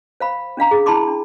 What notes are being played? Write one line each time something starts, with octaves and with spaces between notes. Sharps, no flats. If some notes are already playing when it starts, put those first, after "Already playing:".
C5 F5 B5
C#4 D4 F5 A#5
G#4
E4 A5 B5 C6 D6
D4